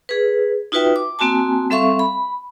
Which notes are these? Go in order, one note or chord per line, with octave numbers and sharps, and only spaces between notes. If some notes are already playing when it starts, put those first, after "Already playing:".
G#4 B4
D#4 F4 F#4 B4 E5 G5
D6
A#3 C4 F#4 G#5 A5
G3 C4 A4 E5 F5 C#6
B5